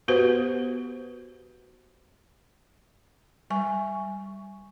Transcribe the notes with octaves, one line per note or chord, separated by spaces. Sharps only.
B3 F#4 G4 B4 C5
G3 G#5 C#6